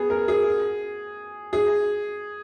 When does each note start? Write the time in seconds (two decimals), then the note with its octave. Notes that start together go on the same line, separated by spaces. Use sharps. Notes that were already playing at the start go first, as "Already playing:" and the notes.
Already playing: B3 G#4
0.10 A#4
0.28 G#4
1.53 G#4